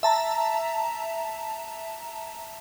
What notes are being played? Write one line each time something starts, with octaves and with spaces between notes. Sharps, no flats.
E5 A5 A#5